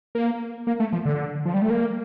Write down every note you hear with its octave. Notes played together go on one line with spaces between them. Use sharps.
A#3
A#3
A3
F3
D3
F3
G3
A3
A#3